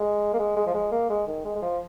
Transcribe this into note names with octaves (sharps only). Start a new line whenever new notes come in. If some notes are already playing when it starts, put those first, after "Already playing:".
Already playing: G#3
A#3
G#3
G#3
F3
G#3
A#3
G#3
D#3
G#3
G#3
F3